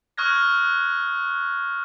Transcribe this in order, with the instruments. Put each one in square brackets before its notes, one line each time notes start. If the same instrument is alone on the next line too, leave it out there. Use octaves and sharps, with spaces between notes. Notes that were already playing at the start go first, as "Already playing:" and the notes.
[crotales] C#6 D#6 F6 F#6 G#6 A#6